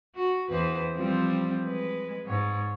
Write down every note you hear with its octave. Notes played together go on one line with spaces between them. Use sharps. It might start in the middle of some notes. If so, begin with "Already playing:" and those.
F#4
E2 B4 C5
F3 G3 C4
G#3 B4
G#2 C#5